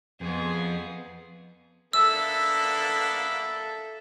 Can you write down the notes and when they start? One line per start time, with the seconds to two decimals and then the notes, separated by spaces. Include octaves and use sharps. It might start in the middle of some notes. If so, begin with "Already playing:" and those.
0.21 F2 B3 G#4
1.93 A#3 B3 D4 A4 E5 E6